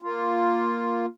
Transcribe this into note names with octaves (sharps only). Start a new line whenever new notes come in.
A#3 F4